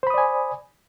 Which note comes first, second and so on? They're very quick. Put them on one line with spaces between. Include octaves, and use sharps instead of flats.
C5 B5 D#6 D5 G#5